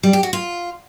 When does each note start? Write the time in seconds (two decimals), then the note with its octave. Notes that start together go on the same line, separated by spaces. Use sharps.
0.03 G3
0.13 G4
0.23 F#4
0.33 F4